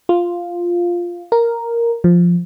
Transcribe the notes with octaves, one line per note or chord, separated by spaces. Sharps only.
F4
A#4
F3